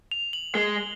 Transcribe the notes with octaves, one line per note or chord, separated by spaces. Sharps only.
F7
F#7
G#3 G7